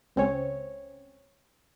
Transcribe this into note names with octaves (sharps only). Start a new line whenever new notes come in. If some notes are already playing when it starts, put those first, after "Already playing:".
C#2 C4 C#4 C#5